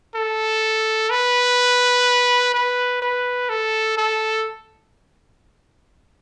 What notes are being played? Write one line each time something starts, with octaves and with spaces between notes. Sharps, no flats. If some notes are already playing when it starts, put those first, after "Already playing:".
A4
B4
B4
B4
A4
A4